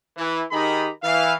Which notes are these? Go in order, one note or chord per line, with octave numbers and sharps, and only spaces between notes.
E3
D#3 D#4 G4 G#4 A#5 B5
E3 F5